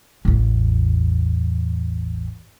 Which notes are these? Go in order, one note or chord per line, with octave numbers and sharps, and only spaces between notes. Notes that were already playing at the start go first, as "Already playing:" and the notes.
A1 E2